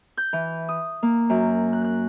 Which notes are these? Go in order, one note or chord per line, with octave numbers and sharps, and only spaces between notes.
G6
E3
D#6
A#3
F#2
F#6
F#6